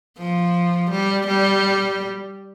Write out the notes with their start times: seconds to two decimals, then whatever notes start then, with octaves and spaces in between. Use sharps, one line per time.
0.18 F3
0.91 G3
1.27 G3